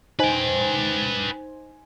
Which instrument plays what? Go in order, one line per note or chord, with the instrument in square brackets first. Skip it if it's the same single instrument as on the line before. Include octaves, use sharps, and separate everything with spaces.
[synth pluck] D#4 C5 G#5 [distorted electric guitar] B4 G5